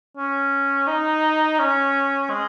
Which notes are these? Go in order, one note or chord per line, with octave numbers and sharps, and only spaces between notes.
C#4
D#4
C#4
G#3